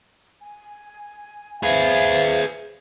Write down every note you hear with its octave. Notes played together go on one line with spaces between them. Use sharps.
G#5
G#4 B4 C5 E5 F5